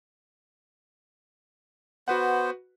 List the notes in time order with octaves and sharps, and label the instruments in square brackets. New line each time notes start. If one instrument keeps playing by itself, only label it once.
[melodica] B3 C5 [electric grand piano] F#4 B4 F#5